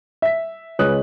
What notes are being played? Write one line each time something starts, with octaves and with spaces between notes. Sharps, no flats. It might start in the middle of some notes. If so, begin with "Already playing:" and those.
E5 B6
C#2 G#3 C#4 B4 D#6 F#6